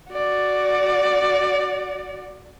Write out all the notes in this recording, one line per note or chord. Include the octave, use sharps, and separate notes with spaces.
F#4 D5